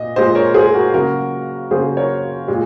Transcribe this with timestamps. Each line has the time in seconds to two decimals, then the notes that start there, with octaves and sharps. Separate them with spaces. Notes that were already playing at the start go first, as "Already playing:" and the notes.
Already playing: A#2 D#5
0.16 A#2 G#3 C5 D#5
0.35 A#4 C#5
0.54 G#4 C5
0.74 F#4 A#4
0.94 C#3 F#3 A#3 F#4 A#4
1.71 C#3 F#3 A#3 G#4 C5
1.97 A#4 C#5
2.48 A#2 G#3